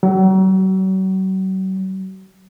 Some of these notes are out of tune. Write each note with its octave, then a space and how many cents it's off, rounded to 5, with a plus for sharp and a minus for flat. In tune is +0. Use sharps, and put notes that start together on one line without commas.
F#3 +40